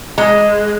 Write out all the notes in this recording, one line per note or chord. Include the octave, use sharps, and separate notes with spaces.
G#3